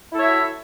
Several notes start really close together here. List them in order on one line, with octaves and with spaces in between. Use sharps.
E4 A4 C#5 E5 F#4